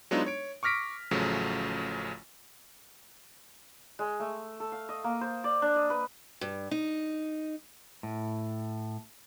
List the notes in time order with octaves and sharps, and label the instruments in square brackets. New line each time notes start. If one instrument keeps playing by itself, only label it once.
[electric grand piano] F#3 G#3 B3 D4 D#4 F4
C#5 D7
C#6 D6 F6 A#6 B6 D7
A1 C#3 F3 F#3 A3
[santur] G#3
A3
A4
F5
D#5
A#3
C5
D5
D4
D#5
B4
[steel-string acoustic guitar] G2
D#4
[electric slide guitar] A2